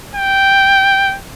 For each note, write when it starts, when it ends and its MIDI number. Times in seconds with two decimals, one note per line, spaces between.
0.16 1.17 79